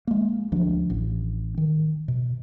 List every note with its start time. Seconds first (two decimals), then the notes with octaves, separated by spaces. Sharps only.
0.07 G#3 A#3
0.52 D2 F3 D4
0.90 A1
1.58 D#3
2.08 B2